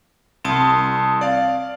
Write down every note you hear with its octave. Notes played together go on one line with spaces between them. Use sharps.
C2 C4 A5 D#6
D5 F5